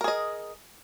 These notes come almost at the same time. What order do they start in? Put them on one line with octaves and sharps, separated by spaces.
A#4 G#4 D#5